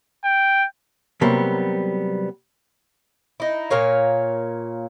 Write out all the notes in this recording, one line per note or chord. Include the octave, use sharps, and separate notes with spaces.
G5
C3 F#3 G3 A#3 B3
D#4 E4
A#2 A#4 C#5 F5